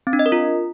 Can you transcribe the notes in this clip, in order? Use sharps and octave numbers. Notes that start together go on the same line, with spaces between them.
C4
D4
D#5
A#4
F4